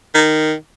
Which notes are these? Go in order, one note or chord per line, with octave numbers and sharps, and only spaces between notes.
D#3